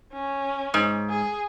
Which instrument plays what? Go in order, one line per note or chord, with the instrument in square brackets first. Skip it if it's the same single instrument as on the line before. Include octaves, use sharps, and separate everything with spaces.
[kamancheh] C#4
[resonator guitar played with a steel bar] G#2
[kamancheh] G#4